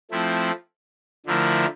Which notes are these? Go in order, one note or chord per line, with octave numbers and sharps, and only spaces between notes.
F3 A3 C4 E4
D3 F3 A3 E4 A#4